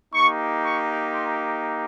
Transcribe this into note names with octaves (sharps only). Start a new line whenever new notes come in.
A#3 D#4 G4 C#6
C#6
C6